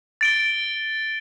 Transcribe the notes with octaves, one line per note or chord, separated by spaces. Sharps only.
A6 D7 G7